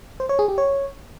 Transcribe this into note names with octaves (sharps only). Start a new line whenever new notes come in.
C5
C#5
G#4
G4
C#5